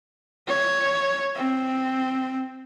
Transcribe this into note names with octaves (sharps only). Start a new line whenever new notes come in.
C#5
C4